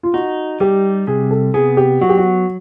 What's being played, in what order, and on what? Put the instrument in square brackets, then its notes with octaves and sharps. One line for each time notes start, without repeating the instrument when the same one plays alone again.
[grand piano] F4
[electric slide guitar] D#4 [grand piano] F#4
[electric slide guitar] G3 [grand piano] G4
[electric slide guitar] C3 [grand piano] G#4
[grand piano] A4
[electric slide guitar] B3 [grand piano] G#4
[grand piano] G4
[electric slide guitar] F#3 [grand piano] F#4
[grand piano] G4
F#4